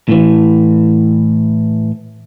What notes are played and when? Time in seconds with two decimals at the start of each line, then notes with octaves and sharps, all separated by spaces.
0.09 A2 E3